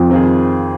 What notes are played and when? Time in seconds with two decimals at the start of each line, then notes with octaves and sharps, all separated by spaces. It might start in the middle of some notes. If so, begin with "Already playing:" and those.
Already playing: F2
0.10 D#3 C4 F4 G#4